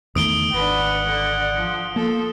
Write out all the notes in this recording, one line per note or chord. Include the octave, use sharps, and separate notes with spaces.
E2 D#3 A3 D#6 D7 G7
G#1 D4 B4 F#5
D3 D5
F3
F3 A#3 A4